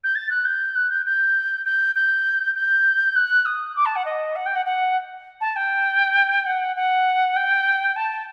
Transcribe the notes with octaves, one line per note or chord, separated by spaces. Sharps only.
G6
A6
F#6
G6
F#6
G6
G6
G6
G6
G6
F#6
D#6
D6
A5
F#5
D#5
F#5
G5
F#5
F#5
A5
G5
F#5
F#5
G5
A5